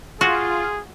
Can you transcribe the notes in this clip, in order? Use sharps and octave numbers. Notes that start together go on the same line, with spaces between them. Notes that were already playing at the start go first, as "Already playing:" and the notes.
F4 F#4 G#4